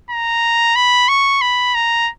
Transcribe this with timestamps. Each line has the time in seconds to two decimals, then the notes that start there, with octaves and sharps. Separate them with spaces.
0.10 A#5
0.76 B5
1.09 C#6
1.42 B5
1.75 A#5